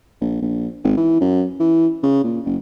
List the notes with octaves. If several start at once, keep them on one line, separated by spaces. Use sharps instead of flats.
A#1
A#1
G#1
E3
F#2
E3
C#3
A#2
F#1